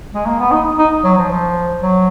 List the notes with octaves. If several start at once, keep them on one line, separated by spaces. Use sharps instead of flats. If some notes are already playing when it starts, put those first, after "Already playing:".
G#3
A#3
B3
D#4
D#4
F#3
F3
F3
F#3